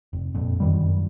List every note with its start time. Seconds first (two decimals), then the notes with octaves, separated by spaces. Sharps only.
0.13 F1
0.35 F2 A#2
0.60 F#2 D#3 G3